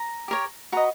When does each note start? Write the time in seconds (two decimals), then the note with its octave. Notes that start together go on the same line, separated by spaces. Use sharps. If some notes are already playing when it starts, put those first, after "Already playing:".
Already playing: A#5
0.28 G4 A#4 C#5
0.72 F#4 B4 D#5 A#5